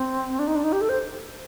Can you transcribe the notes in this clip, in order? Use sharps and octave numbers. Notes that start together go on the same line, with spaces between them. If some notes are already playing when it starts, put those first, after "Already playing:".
Already playing: C4
D4
D#4
D4
D#4
G4
A4
C5